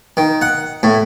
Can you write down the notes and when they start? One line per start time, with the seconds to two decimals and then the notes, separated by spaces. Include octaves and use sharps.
0.17 D#3
0.42 F#5
0.83 A2